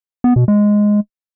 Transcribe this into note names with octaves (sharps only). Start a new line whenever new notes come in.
B3
B2
G#3